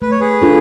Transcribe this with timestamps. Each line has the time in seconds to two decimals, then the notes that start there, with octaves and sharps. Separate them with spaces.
0.02 A3 B4
0.11 C#5
0.20 G#4 B4
0.42 D4 F4 A4